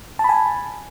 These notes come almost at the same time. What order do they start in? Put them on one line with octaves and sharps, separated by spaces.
A5 B5 G#5